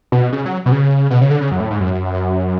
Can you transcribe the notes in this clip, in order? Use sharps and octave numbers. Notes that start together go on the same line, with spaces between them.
B2
C#3
F#3
B2
C#3
B2
C#3
D3
C#3
F#2
A2
G#2
F#2